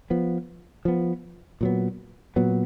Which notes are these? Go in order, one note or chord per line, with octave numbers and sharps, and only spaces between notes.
F3 B3
F3 B3
A#2 F#3 B3
A#2 F#3 B3